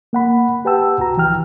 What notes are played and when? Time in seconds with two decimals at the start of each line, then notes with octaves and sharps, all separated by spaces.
0.13 A#3 F#5 B5
0.65 G4 B4 F#5 G5 A5 E6
0.99 C2 F#4 A#5
1.17 E3 G5 F6